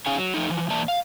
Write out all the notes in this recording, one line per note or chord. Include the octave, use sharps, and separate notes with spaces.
C#4 D#4 G#4 F5 G#5
F#3
F3 A3 D#4
E3 F3
E3 A#3 C5 D5 E5 A5
F5